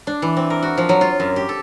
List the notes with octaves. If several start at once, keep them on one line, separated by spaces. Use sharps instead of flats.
D4
E3
C4
A#4
F#4
F3
F#3
F4
F#2
G4
A4